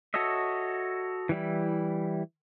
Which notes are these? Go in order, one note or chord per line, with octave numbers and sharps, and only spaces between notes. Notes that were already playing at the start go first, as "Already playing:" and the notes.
F#4 A4 C#5 D#5 E5
E3 G3 E4